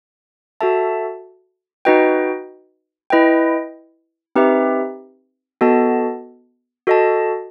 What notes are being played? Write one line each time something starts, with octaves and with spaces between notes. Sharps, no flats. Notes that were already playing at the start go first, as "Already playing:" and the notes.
F#4 A4 E5 A5
D#4 F#4 B4 D#5 G5
E4 B4 D#5 G5
C4 D#4 G4 B4 E5
B3 F#4 A4 D#5 A5
F#4 A4 D#5 A5